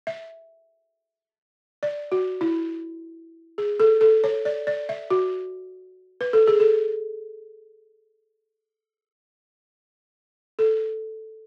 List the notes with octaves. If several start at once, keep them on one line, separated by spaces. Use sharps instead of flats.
E5
D5
F#4
E4
G#4
A4
A4
C#5
D5
D5
E5
F#4
B4
A4
G#4
A4
A4